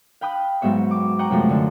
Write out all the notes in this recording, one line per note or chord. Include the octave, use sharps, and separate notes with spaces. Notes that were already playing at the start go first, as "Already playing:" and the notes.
F5 G5 B5 D#6 F#6
G#2 F#3 B3 E5 C#6
D6
D#5 F#5 G5 A#5 C#6
F#2 C3 F3 G#3 A3
D3